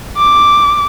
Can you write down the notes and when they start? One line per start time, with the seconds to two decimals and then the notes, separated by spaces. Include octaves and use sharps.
0.17 D6